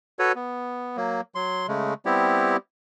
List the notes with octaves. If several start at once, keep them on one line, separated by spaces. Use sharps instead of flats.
F#4 A4 B4 C#5
B3
F#3 A#3
F#3 C6
C#3 G#3 A3
G3 B3 C4 E4 G4